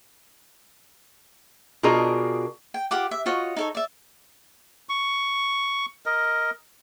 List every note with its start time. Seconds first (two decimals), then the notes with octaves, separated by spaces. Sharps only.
1.83 B2 D4 F4 G#4 A#4 D#5
2.74 G5
2.91 F4 G4 F#5 D6
3.11 E5
3.26 F4 F#4 C#5 D#5
3.57 D#4 A4 C#5
3.75 D5 E5
4.89 C#6
6.06 A#4 D#5